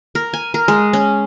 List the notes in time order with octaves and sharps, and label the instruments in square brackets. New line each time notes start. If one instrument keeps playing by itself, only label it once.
[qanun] A#4
G#5
A#4
G#3
C#4